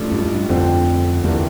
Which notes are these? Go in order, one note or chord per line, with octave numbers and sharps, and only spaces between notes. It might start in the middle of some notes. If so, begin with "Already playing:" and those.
Already playing: A1 A2 F3 A3 D4
G2
G2
F2 D3 F3 C4
E2 G2 D3 G3 A#3 E4